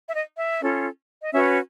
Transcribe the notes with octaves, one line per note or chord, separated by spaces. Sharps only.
E5
D#5
E5
C#4 F4 A4
D#5
C#4 F#4 B4 E5